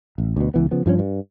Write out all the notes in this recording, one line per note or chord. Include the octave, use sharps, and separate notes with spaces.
A1
D2 B2
C#2 E3 B3
C#3 F3 B3
G2 F3 F#3 C#4
G2